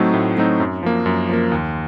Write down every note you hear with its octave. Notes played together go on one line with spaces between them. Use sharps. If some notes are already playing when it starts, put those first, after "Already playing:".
Already playing: A2 F#3 A3 C4 D#4
A2
F#3 A3 C4 D#4
F#2
F3 A#3
F#2
F3 A#3
D#2